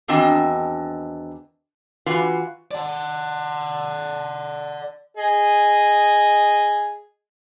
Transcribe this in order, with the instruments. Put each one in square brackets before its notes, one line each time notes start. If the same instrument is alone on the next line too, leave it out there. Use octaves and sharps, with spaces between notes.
[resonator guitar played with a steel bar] E2 D#3 C4 D4 F#4 D#5
E3 F4 F#4 B4 F5
[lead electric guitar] D5 F#5
[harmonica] G#4 D#5